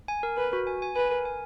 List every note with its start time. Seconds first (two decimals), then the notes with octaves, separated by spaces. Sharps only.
0.08 G#5
0.23 A#4
0.37 A#4 B4
0.53 F#4
0.67 G#5
0.82 G#5
0.96 B4 G#5
1.11 A#4
1.25 G#5